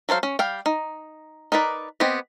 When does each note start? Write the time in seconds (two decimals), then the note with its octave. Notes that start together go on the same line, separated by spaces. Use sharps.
0.09 F#3 A4 C5 F5
0.23 C#4
0.39 G3 F5 G5
0.66 D#4
1.52 D#4 A#4 B4 D5
2.00 B3 C4 G4 D#5